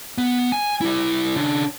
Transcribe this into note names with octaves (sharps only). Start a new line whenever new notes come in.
B3
G#5
G3 E4
C#3 D4